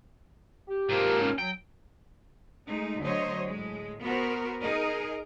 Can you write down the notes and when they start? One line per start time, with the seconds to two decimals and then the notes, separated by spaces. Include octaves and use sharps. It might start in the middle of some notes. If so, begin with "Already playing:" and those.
0.68 G4
0.89 G#2 F3 A#3 C4 A#4
1.20 C#4
1.38 F#3 G5
2.67 G#3 A3 D#4
3.01 D2 D3 F#3 C5 C#5 D#5
3.50 A2 G#3
4.03 B3 F#4 A#4 C5
4.62 D#4 G#4 A#4 D#5